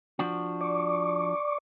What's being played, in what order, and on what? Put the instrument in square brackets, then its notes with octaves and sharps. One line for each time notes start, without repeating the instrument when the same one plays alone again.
[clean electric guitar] F3 D4 F#4
[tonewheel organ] D5 C#6 D6